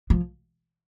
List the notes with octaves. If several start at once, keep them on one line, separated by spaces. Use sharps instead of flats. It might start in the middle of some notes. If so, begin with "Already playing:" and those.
F3